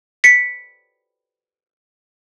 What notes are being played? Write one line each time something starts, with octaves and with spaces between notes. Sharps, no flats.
B6 C#7